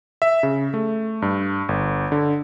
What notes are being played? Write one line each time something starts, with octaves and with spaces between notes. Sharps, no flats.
E5
C#3
A3
G2
G1
D3